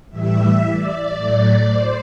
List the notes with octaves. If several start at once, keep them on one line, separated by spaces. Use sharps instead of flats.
A2 E3 G3 E5
D5
A2 F#3 A3
C5